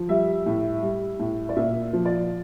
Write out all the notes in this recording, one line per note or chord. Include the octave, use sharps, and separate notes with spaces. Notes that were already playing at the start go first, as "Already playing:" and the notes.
Already playing: F3
G3 E5
A2
G3
A2
D5
A#2 E5
F3
D5